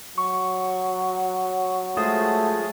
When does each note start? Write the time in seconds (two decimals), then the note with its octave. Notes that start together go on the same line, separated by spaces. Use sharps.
0.18 F#3 C#6
1.97 G#3 A3 F4 C5 D#6